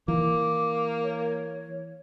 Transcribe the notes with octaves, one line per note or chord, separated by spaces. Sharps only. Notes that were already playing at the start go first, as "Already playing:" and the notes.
E3 A#3 D6
C#5